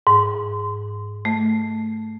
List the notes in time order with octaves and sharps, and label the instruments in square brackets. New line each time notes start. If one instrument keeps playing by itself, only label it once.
[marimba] G#2
A3